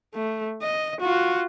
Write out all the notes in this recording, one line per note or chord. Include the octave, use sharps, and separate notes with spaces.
A3
D#5
F4 F#4